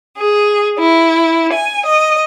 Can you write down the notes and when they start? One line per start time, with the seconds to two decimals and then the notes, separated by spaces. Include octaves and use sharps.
0.17 G#4
0.77 E4
1.53 G#5
1.85 D#5